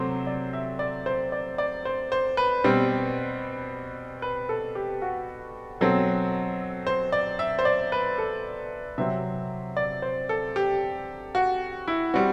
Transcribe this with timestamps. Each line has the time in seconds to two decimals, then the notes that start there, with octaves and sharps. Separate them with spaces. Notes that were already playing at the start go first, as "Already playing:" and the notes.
Already playing: C3 F#3 A3 C4 C5
0.27 D5
0.53 E5
0.79 D5
1.06 C5
1.32 D5
1.58 D5
1.85 C5
2.12 C5
2.37 B4
2.64 B2 G3 C4
4.22 B4
4.49 A4
4.75 G4
5.02 F#4
5.81 B2 F#3 C4 A4
6.87 C5
7.12 D5
7.39 E5
7.59 C5
7.65 D5
7.92 B4
8.18 A4
8.98 C3 F#3 C4 E5
9.77 D5
10.02 C5
10.29 A4
10.56 G4
11.35 F#4
11.88 E4
12.14 G3 C4 F#4